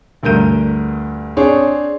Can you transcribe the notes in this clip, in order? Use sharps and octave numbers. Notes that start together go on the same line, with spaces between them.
D2 G2 A#4 G6 D#7
C4 D4 G#4 C#5